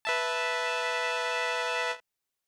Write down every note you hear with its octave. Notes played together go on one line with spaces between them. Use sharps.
B4 E5 A5